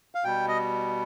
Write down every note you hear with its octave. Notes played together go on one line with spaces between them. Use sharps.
F5
B2 G3 G5
D#5